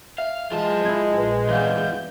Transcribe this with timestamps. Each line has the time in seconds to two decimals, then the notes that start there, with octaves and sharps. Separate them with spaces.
0.18 E5 F5
0.52 E3 G#3 F4 A5
0.85 E4 D#5 G#6
1.17 A#1 B4
1.49 E3 G3 B4 F5 F#5 G6